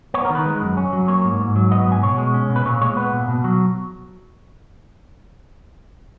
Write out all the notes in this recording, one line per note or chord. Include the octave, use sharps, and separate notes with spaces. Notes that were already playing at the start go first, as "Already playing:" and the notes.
B3 C#5
A#4
D#3
B4
G#3
F#2
C#4
F#3
A#3 C#5
G#2
G#2
F#3
B3 D#5
G#2 G#5
B2 C#5
G#3
C#4
B2
B4
A#2 C#5
G#3 C#5
B3 B4
A#2
B2
F#3